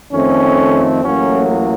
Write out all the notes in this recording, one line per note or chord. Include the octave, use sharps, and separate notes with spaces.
F2 D#3 A3 C4 C#4
A1 A2 F#3 A#3 C#4